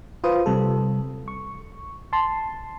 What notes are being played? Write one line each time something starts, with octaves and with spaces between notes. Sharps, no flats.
F4 B4 C5 D#6
C3 G3 A4
C#6
A5 C6